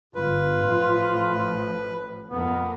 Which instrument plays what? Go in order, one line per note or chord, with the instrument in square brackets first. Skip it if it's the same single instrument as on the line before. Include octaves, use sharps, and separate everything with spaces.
[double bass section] G1 [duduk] F4 [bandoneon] B4
[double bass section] A1 A2 F3
[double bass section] F2 A#3 [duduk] B3